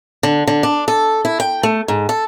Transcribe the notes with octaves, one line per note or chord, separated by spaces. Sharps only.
D3
D3
D4
A4
E4
G5
A3
G#2
A4